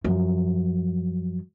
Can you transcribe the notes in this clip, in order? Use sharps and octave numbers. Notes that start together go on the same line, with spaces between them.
F#2 F3